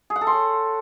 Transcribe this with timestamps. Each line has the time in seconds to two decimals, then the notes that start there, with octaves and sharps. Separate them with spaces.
0.10 G#4
0.16 F#5
0.21 A4
0.27 C6
0.32 C#5